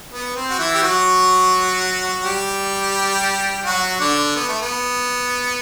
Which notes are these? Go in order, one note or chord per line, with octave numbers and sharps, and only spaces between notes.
B3
C4
F#4
E3 E4
G4
F#3 F#4
G3 G4
F#3 F#4
D3 D4
B3
A3
B3